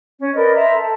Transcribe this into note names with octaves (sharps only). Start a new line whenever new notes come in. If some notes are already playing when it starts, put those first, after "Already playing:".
C#4
A#4 B4 D5 D#5
C5 E5 A#5
A4